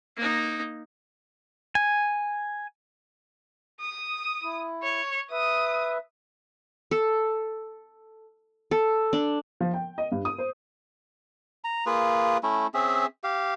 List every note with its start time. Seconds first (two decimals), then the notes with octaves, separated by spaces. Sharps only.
0.17 A#3 D#4
1.75 G#5
3.80 D#6
4.43 E4
4.83 C#5
5.31 B4 E5 D#6
6.91 A4
8.71 A4
9.13 D4
9.60 F3
9.74 G5
9.98 D#5
10.12 G2
10.25 D#6
10.38 C5
11.64 A#5
11.86 A#3 F4 G#4 B4
12.43 A3 C#4 E4
12.74 C4 C#4 G#4 E5
13.24 G4 F5